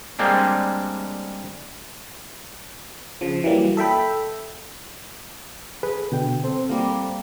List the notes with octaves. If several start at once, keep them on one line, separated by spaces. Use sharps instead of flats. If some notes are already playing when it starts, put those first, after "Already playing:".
G3 G#3 A#3 C4 D4
C#3 F3
E3 F#3 G3 A#3
A4 E5 G5 B5
G#4 A4 B4
B2 D3 G5
C4 A4 C5
G3 A#3